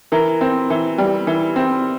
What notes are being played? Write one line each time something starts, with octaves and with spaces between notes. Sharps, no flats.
E3 A#4
C4
E3
G3
E3
C4